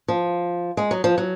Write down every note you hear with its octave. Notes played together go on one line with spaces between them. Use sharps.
F3
G#3
F#3
F3
F#3